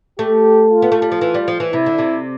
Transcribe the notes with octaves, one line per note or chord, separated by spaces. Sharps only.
A3 G4
F4
B3
A3
G3
F3
E3
G3
F3
E3
C3 E4
D3
C3